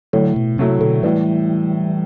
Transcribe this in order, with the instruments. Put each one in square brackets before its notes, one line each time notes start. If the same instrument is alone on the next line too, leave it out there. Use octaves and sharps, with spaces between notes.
[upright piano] A2 [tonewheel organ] D3 F#3
[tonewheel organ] B2
[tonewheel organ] C3 [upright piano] F#3 A3 E4
[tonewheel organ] B2 D3
[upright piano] A2 [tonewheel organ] E3 G3